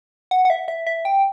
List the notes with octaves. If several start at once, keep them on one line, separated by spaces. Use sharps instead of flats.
F#5
F#5
E5
E5
E5
G5